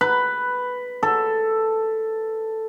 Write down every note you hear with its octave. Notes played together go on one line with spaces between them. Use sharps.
B4
A4